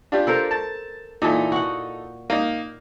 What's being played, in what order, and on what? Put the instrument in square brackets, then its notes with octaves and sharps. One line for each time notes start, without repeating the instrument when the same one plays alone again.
[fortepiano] D4 F4 G4
[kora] A4 A#4 C5
[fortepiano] A5
[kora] A#2 E3 [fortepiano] D#4 A4
[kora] F#4 F#5
[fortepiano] A#3 D#4